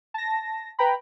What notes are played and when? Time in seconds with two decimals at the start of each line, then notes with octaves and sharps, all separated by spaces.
0.14 A5 A#6
0.79 B4 G5 A#5 B5